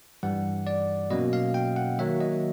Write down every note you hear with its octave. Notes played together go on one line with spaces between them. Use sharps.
G2 E3 G3 F#5
D5
B2 F#3 A#3 C#4 D#5
F5
G5
F#5
D#3 F#3 A#3 E5
D#5